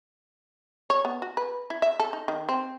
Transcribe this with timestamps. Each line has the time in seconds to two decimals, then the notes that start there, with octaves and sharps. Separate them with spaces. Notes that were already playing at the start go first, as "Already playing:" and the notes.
0.90 C#5
1.05 B3
1.22 F#4
1.37 B4
1.70 E4
1.82 E5
2.00 A4
2.13 D#4
2.28 D#3
2.49 C4